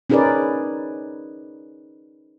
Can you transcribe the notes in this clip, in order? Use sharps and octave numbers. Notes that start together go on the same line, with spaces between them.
C#4 D#4 G#4 A#4 B4 D5